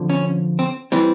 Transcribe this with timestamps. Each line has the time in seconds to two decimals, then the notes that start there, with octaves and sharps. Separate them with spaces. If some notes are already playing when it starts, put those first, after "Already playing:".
Already playing: F2 D3 F3
0.10 C#4
0.59 C4
0.92 E3 G3 C4